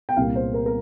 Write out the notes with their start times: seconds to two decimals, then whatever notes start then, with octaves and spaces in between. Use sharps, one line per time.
0.09 G5
0.17 C2 A#2 G3 A#3 F5
0.36 C5
0.54 A#4
0.66 A#4